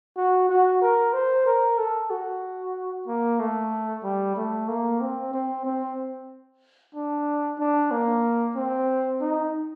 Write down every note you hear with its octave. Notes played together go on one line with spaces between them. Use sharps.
F#4
F#4
A#4
C5
A#4
A4
F#4
A#3
A3
G3
A3
A#3
C4
C4
C4
D4
D4
A#3
C4
D#4